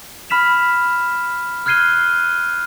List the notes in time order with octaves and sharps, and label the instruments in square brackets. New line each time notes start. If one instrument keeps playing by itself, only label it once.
[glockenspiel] B5 F6 B6 E7 F7
F6 F#6 G#6 C7 D#7 G7